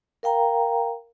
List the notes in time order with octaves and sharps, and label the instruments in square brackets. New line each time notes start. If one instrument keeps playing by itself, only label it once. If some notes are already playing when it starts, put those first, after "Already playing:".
[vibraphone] A#4 F5 G5 A#5